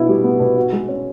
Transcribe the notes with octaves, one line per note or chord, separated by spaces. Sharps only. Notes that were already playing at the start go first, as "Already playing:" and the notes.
Already playing: B2 B3 E4
G3
B3
B2
F#4
G#3
C#4